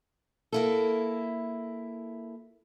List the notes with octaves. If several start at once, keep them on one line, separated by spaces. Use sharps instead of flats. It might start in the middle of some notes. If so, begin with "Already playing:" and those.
A#3 E4 A4